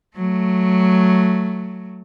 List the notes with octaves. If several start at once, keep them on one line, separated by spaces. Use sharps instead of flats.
F#3 A3